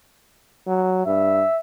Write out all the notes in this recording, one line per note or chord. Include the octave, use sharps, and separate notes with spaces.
F#3
G2 E5